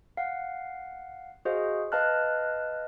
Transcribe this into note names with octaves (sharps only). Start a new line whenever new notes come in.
F5 F#5
F#4 G#4 C5 D#5 F5
B4 D#5 F5 A5 F6 F#6